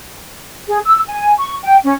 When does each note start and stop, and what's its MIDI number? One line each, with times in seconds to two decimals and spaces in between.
0.68 0.78 68
0.85 0.99 88
1.07 1.33 80
1.38 1.56 85
1.63 1.76 79
1.84 1.93 61